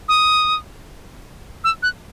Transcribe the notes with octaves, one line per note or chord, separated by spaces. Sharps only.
D#6
E6
F#6